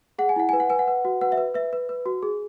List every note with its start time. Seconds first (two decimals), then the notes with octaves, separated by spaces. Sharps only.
0.18 G#4 F#5
0.29 G#5
0.36 E4 F#5
0.49 B4 G#5
0.60 F#5
0.70 B4 G#5
0.79 F#5
0.88 B4
1.05 F#4
1.21 B4 F#5
1.32 E5
1.37 B4
1.54 B4 E5
1.73 B4
1.89 B4
2.06 F#4
2.23 G#4